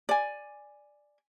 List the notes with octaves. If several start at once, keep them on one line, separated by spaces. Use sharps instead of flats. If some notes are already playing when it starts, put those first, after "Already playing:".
D5 G#5